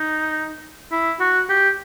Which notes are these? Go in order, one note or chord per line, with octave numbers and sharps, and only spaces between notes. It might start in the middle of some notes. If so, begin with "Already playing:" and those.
Already playing: D#4
E4
F#4
G4